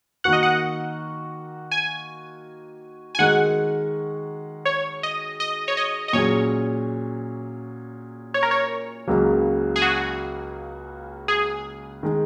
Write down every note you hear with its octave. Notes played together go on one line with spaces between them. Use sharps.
D#3 A#3 F#4 A#4 F#5
D#5
F#5
G#5
G#5
D#3 G#3 F#4 A#4 F#5
C#5
D#5
D#5
C#5
D#5
D#5
A#2 F#3 C#4 G#4 C#5
C#5
A#4
C#5
C#2 C#3 F#3 A#3
G#4
F#4
G#4
D#3 G#3